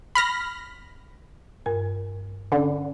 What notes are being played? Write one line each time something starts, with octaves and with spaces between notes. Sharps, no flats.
B5 F6 A#6
G2 A#4
D3 C#4